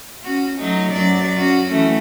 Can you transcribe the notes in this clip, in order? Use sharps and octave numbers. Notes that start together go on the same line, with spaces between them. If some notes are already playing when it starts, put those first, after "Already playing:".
C#4 F#4
F#3 A3 D#4
F#2 F#3 D5
C#4 F#4
E3 A3 C#4